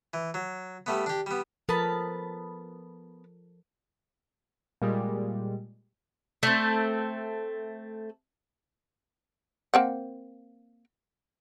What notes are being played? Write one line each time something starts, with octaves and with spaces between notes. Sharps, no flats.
E3
F#3
G3 A3 B3
D4 G4
G3 B3
F3 B3 A4 A#4 A5 B5
A#2 G3 G#3
A3 C4
A#3 C4 F#5